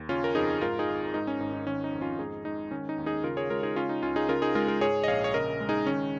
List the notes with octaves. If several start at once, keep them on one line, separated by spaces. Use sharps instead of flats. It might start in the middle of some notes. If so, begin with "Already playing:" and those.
Already playing: D#2
C#3 C#4 F4
A#4
F2 D#4 G#4
G#2 F4 A#4
D#4 G#4
G#1
G#2 D#4
C#4
G#1 D#4
D#4
D#3 C#4
D#4
F2
C#4 F4
G#2 D#4 G#4
G#3 D#4
D#3 C#4
D#4
D#2
D#4 G#4
C#3 F4 A#4
G#4 C#5
G#3 F4 A#4
D#4 G#4
C#3 C#4 F4
D#4
C#2 C#4 F4
D#4 G#4
C#3 F4 A#4
D#4 G#4
G#3 F4 A#4
F4 A#4
G#2 G#4 C#5
D#5
A#1 C#5 F5
C#5
C#3 A#4 D#5
G#3
D#4 G#4
D#3 C#4